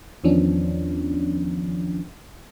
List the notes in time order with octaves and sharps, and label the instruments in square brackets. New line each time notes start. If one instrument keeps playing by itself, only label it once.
[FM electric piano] E2 D#3 F3 B3 C#4 D4